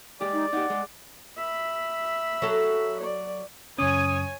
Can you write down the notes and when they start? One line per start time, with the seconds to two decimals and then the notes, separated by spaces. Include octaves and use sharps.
0.21 G#3 G4 D5
0.33 D#4
0.53 D#4 G4 F#5
0.70 G#3
1.37 E5 B5
2.42 F#3 A4
3.00 D5
3.78 F#2 C#3 C#4 C#5 G#5 D#6